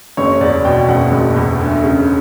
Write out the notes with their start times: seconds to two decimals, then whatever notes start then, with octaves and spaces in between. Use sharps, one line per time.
0.17 F#1 C#5
0.41 E2 D5
0.65 B2 G5
0.89 F#1 F#5
1.12 F#1
1.36 E2
1.60 D2
1.84 C#3